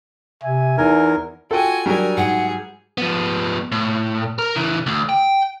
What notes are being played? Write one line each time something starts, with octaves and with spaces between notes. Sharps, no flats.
C3 E5 G#5
E2 D#4 A#4 G#5
F4 F#4 A4 G5 G#5 D#7
F#3 G3 D4 G#4 A#4 D5 G#5
G#2 G#4 F#5
F3 B3
A2
A#4
C#3 E3
D2
G5